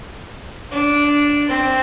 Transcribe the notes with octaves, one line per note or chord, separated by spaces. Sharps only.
D4
C4